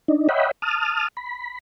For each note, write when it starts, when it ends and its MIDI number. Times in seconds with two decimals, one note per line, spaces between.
0.08 0.28 62
0.08 0.28 63
0.29 0.51 73
0.29 0.51 75
0.29 0.51 76
0.29 0.51 78
0.29 0.51 79
0.29 0.51 83
0.62 1.08 81
0.62 1.08 87
0.62 1.08 89
1.17 1.58 83